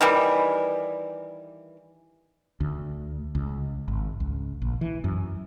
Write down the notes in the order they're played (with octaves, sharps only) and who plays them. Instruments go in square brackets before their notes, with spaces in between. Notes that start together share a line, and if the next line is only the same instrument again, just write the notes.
[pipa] D#3 E3 G3
[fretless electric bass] D2
C#2
G#1
C#2
A#1
E3
F#2